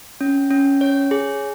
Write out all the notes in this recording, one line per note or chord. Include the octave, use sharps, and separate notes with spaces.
C#4
C#4
C#5
G#4